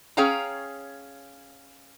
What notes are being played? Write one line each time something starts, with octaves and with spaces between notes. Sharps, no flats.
C#4 G#4 C#5 F5 G5 A#5